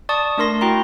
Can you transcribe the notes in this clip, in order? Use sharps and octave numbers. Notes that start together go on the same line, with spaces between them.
D5 A5 C#6 D#6
A3 D4 A#4 C6 A#6
E4 F#4 G5 A#5 C6